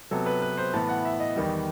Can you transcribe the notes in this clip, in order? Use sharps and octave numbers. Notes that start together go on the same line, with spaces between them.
C3 F#3 B3 A4
B4
B4
C5
A2 E3 B3 A5
F#5
E5
D#5
E2 D#3 G3